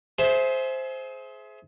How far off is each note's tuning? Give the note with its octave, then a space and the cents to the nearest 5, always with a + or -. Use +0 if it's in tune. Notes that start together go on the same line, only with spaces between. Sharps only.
G#4 +30 C5 +0 E5 +0